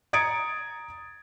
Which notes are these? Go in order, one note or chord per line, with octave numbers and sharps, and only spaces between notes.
A#5 D#6 G#6 A6 C#7 D7